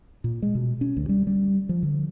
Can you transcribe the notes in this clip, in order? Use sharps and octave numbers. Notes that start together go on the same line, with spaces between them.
A#2
G#3
B2
C#4
D2
G3
G3
F3
D3